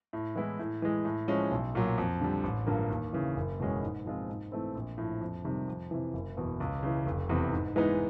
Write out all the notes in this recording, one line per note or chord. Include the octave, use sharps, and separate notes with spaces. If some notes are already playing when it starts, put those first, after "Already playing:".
A2
E3 G#3 B3 E4
A2
E3 G#3
A2
F3 G#3 C#4
B1
A#2 F#3
F2
D3 G3
A1
G2 D3 F3 A#3
D#2
C#3 E3
F#1
E2 B2 G#3 C#4
G#2
F3 G#3 C4 F4
G#2
E3 A3 C4
A#1
A2 F3
F2
C3 D#3 G3
F2
C3 E3
F#1
E2 B2
C#2
C#3 E3
F1
E2 C3
G#2
E3 G#3 B3 D#4